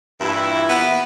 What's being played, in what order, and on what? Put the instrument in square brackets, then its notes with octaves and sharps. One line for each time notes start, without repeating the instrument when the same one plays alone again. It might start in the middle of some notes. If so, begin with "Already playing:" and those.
[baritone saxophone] G2 [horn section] A#2 E3 E4
[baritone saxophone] B3